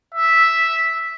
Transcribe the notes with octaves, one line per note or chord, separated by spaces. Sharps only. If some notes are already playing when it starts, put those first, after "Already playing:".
E5